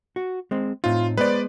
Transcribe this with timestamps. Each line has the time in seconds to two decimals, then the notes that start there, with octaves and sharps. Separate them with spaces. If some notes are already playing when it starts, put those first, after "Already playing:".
0.16 F#4
0.51 G#3 C4
0.84 A2 C4 D#4 F4
1.18 G#3 B3 B4 C5 D5